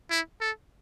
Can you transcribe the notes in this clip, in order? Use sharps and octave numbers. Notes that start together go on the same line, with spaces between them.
E4
A4